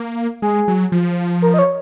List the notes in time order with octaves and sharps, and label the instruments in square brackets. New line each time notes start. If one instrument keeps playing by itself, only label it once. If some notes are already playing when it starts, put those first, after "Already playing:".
Already playing: [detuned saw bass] A#3
[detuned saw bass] G#3 [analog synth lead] G#4
[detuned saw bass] F#3
F3
[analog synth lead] A#4
D#5
C#5